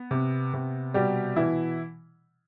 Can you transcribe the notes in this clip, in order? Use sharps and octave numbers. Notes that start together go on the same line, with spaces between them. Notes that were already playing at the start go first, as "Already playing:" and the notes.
Already playing: B3
C3
C3
B2 G3 G4
B2 E3 E4